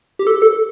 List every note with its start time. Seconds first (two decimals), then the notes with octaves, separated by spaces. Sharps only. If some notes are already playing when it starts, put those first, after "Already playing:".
0.19 G4
0.27 A4
0.42 A4